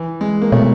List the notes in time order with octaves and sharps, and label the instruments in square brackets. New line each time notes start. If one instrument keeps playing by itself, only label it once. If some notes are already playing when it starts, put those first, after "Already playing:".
Already playing: [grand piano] E3
G#3
A#3
[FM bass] B2 [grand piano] A3